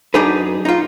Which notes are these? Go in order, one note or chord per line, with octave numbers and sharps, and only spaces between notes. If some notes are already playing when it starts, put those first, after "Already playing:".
F#2 D4 D#4 G#4 B4
D#4 F4